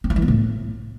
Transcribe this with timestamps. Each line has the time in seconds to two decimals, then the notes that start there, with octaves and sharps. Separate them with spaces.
0.04 C4
0.10 F3
0.16 E3
0.22 B3
0.28 A2